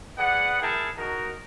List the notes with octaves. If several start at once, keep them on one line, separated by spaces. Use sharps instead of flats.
G#4 B4 D5 F#5
E4 G#4 A#4 E5 G5 A5
D#4 F#4 A#4